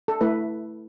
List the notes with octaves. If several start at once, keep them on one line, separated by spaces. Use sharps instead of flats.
A4
A3 E4 B4